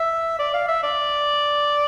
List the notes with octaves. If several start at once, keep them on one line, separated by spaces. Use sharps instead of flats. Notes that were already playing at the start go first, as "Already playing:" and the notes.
Already playing: E5
D5
F5
E5
D5